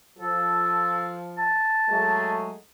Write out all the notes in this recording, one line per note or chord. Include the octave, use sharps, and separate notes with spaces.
F3 A4
A5
F#3 G#3 A3